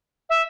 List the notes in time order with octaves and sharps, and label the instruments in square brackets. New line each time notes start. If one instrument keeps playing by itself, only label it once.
[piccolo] E5